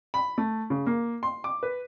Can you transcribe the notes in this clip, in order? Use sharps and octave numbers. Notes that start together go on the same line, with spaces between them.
B5
A3
C#3
A#3
C6
D6
B4